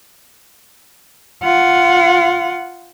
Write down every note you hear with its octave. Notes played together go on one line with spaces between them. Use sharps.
F4 F#5